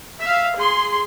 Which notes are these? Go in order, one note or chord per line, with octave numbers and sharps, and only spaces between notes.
E5 F5
G#4 C6